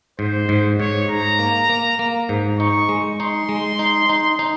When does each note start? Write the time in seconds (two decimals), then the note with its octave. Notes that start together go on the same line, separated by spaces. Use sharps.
0.19 G#2 C5
0.49 G#2
0.79 G#2 C#5
1.09 G#2 A#5
1.39 A#3
1.69 A#3
1.99 A#3
2.29 G#2
2.59 D#4 C#6
2.89 G#3
3.19 D#4 C6
3.49 G#3
3.79 D#4
4.09 D#4
4.39 D#4